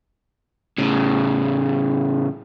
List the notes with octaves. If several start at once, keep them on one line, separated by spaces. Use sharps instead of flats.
A2 C#3